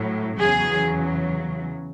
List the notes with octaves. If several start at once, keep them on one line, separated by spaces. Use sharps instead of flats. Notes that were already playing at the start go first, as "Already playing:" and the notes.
Already playing: A2 F#3
E2 C#3 F#3 G#4